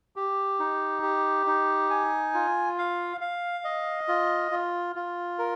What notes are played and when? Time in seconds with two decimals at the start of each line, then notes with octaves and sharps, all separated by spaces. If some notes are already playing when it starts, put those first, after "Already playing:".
0.16 G4
0.59 D#4
1.03 G4
1.46 D#4
1.90 G#5
2.34 F4
2.78 F5
3.21 F5
3.64 D#5
4.08 F4
4.52 F4
4.96 F4
5.39 A#4